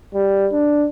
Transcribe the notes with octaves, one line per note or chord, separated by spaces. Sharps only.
G3
D4